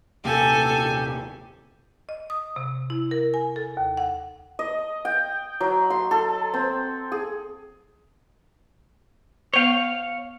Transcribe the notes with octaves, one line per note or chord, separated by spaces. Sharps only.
D#1 C3 A#3 G4 A4 G#5
D#5
D#6
C3
E4
A#4
G#5
A4
D#2
F#5
D#5
G5
F#3
C6
A4
C4
G#4
B3 C5 C#5 F5